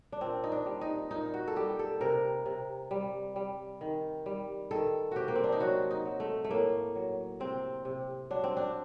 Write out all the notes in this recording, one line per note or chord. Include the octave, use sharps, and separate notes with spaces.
D4
A#2 C4
D#4
D4
G3
D#4
A#2 D#4
F#4
A4
G3 G4
A4
C3 A#4
C3
G3
G3
D#3
G3
D#3 A4
C3 F#4 G4
A#3
C4
D4
D#4
F#3 F#4
D#4
F#3
A3
A3
A2 A#3
F#3
C3 C4
C3
F#3 D4
C4
D4